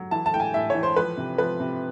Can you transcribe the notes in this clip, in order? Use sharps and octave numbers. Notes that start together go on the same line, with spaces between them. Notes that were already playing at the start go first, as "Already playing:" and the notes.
Already playing: F#3
E3 A5
A5
A2 G5
G#5
A2 E5
E3 C#5
C5
F3 B4
C3
F3 B4
C3